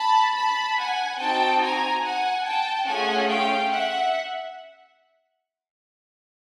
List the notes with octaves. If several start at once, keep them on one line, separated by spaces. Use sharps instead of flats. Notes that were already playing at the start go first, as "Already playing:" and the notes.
Already playing: A5 B5
A5 B5
F#5 G#5
C4 D#4 F#4 G5 A5
G#5 A#5
F#5 G#5
G5 A5
A3 C#4 F4 G#4 F#5 G#5
F5 G5
E5 F#5